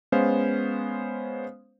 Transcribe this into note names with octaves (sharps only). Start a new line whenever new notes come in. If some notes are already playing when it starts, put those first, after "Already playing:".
G#3 B3 C#4 C5 F5